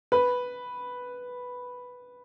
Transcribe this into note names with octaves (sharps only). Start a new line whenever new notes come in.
B4